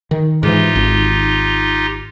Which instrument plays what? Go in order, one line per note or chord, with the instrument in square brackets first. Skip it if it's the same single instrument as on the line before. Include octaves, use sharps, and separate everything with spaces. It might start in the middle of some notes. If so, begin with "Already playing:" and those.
[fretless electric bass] D#3
[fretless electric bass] G#2 E3 [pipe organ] D#4 F4 G4
[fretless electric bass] G#1